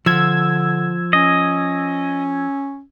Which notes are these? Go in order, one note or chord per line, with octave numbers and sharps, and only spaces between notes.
D3 F3 E6 G#6
C#4 D#5